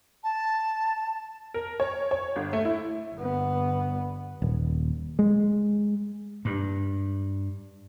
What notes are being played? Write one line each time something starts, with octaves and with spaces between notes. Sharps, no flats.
A5
A#4
C#5
C#5
G1
A3
E4
G1 B3
D#1
G#3
G2